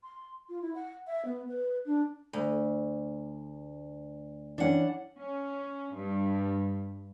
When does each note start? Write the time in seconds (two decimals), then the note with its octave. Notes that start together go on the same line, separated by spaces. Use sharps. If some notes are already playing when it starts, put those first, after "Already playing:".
0.03 C6
0.49 F4
0.61 E4
0.75 F#5
1.07 E5
1.25 B3
1.49 B4
1.86 D4
2.33 D2
4.58 E3 C#4 D4 F#5
5.18 C#4
5.94 G2